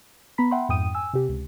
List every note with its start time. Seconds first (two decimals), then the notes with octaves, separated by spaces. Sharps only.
0.38 B3 A#5 B5 B6
0.51 E5 F#5 G5 B5 C6
0.69 F2 G#2 G5 D#6 D#7
0.95 G#5 E6
1.13 C3 G4
1.29 C#2